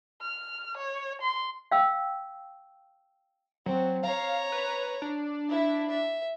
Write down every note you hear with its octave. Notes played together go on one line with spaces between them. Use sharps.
F6
C#5
C6
F5 G5 E6
F#3 C4
C#5 F5 A#5
B4
D4
E4 E5
E5